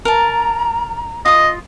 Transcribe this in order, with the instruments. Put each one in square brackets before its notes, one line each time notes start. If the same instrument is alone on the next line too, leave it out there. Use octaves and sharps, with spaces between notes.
[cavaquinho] A#4 A5 [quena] A#5
[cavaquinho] F4 D#6 [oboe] D#5